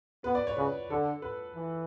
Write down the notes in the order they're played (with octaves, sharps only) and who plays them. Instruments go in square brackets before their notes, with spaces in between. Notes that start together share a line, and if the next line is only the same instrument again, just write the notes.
[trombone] B3 [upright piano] B4
[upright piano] D5
C#5
[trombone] C#3 [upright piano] B4
[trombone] D3 [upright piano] A4
[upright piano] B4
[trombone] E3